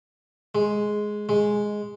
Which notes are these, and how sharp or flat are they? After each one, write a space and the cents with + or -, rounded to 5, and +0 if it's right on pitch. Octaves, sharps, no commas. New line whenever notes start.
G#3 +5
G#3 +0